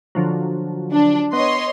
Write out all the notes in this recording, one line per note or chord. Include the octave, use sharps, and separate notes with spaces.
D3 F3 F#3
D4
B3 C#5 D#5 C6